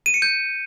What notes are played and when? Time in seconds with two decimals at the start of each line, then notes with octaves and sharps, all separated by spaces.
0.06 D#7
0.14 C#7
0.22 G6